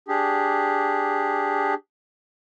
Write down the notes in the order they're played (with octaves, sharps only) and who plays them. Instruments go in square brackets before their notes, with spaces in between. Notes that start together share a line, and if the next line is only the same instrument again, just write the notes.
[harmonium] D4 G4 G#4